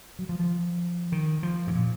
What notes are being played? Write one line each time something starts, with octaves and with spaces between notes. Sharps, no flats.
F#3
F3
F3
D#3
F3
G#2
A#2